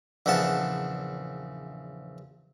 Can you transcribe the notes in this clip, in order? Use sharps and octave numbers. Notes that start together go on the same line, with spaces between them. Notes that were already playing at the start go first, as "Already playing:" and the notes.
A#1 E2 C#3 F#5 A5